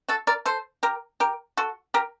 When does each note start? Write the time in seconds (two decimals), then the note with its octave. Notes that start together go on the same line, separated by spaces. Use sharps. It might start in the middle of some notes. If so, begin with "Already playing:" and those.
0.08 F#4 A4
0.27 A#4 D5
0.46 A4 C5
0.83 G4 A#4
1.20 G4 A#4
1.57 F#4 A4
1.94 G4 A#4